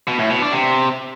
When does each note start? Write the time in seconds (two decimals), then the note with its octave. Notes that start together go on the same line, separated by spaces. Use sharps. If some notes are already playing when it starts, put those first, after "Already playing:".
0.07 B2
0.19 A2
0.30 B2
0.41 D4
0.53 C3